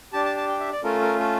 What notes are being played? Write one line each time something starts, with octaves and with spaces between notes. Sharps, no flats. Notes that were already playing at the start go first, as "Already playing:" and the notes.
D4 G4 A5
A5
A5
G5
E5
D5
A3 C#4 F4 A4 A#4
A#4
A4